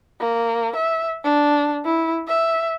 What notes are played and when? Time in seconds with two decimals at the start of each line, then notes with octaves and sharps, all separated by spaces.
0.21 A#3
0.76 E5
1.24 D4
1.85 E4
2.28 E5